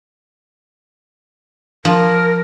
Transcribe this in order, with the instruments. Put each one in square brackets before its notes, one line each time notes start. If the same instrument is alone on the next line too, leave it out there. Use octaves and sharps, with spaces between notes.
[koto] F3 [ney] A#4